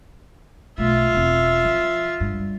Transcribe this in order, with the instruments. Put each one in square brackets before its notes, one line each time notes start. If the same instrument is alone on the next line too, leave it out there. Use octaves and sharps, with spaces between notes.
[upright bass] B1 A3 [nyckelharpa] F4 E5
[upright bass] E1 C4
F3
G2 G3